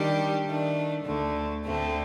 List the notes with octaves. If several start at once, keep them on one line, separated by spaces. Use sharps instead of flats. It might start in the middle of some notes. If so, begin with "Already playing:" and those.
Already playing: D#3 G3 D4 G4
D#3 A3 D4
D2 D3 A3
D2 D3 A3 C4